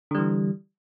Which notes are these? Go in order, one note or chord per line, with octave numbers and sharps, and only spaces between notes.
D3 E3 G3